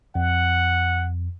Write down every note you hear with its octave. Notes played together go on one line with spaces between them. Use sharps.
F2 F#5